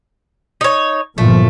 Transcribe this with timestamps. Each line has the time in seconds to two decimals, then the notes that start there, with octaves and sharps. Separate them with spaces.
0.61 D#4 C#5
1.18 G1 A#2 F3 A3